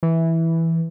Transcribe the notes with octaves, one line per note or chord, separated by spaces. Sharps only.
E3